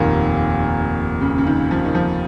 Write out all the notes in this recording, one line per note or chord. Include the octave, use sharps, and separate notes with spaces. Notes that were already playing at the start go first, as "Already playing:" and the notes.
Already playing: F1 D#2 A#2 D#3 A#3
C#3
C#3
D#3
F3
D#3
F3